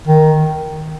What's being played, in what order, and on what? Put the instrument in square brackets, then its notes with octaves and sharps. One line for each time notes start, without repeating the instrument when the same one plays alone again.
[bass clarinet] D#3